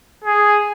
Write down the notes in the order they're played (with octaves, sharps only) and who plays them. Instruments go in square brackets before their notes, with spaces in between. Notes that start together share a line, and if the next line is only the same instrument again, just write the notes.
[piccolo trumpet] G#4